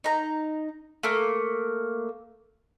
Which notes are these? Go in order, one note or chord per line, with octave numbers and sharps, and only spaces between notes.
D#4 A#5
A3 A#3